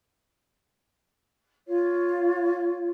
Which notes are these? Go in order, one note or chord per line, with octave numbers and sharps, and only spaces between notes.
F4 C#5